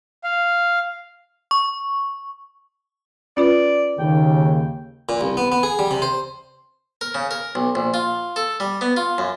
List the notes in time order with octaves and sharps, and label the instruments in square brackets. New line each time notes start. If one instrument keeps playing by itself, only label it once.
[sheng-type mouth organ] F5
[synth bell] C#6
[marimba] C#4 F4 B4 [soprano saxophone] D5
[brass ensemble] D#2 C#3 [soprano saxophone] G5
[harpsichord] A#2
C2
B3
B3
G#4
G3
C3
C5
A#4
C#3
A#4
B1
A#1
F4
A4
G3
B3
F4
F#2